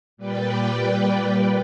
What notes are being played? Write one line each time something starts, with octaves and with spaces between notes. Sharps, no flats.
A#2 G3 B4 D5 G5